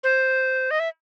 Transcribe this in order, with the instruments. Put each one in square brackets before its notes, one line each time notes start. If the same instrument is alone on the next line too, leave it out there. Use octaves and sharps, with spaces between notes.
[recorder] C5
D#5
E5